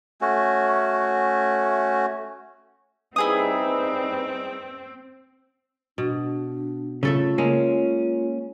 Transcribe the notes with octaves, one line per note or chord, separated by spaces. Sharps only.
A3 C#4 F#4
G3 C4 D#4 E4 G#4 B4 D#6
B2 D4
C#3 A3 F4 A4 E5
G#3 A#3 C#4